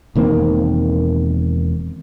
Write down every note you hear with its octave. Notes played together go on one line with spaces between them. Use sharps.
E1 D#3 A#3 C4